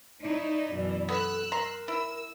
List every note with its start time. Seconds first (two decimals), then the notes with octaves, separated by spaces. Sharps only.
0.22 D#4 E4 C#5 D5
0.72 F#2 B2 E3
1.09 B3 A4 E6 F#6
1.52 A#4 A#5 C6
1.88 E4 E6